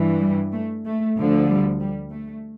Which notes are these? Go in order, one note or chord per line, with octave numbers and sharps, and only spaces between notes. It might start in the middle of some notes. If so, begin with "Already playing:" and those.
Already playing: G2 E3
G3
A3
A3
D2 D3 F3
G3
G3
A3